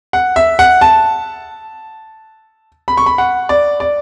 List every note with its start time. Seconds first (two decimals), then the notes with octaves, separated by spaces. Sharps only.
0.13 F#5
0.36 E5
0.59 F#5
0.81 A5
2.88 B5
2.97 C#6
3.06 B5
3.18 F#5
3.49 D5
3.80 D5